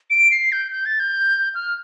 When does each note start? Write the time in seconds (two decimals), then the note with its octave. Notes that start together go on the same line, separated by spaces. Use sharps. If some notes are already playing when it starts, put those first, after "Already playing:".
0.10 D7
0.31 C7
0.52 G6
0.72 G6
0.86 A6
1.00 G6
1.55 F6